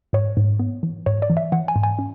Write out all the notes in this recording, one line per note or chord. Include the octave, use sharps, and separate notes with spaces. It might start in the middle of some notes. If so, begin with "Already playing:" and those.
G#2 C#5
G#2
B3
E3
G#2 C#5
D5
E3
E5
E3 F#5
G#5
G#2
G#5
C#4